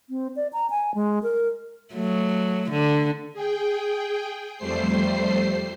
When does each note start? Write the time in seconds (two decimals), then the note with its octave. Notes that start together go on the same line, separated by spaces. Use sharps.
0.10 C4
0.36 D5
0.53 A#5
0.70 G#5
0.95 G#3
1.23 A#4
1.93 F#3 A3
2.71 D3
3.33 G#4 G5
4.57 F2 G3 A3 C5 C7